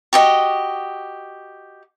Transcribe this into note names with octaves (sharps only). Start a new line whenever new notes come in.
F#4 G4 D#5